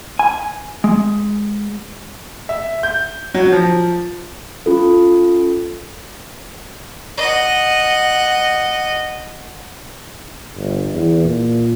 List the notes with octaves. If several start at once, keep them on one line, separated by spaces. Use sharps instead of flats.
G#5
G#3
E5
G6
F#3
F3
C#4 F4 A4
D#5 F#5
G1
E2
A#2